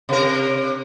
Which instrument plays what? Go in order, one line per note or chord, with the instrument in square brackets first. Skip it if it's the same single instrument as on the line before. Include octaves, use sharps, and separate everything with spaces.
[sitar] C3 A#4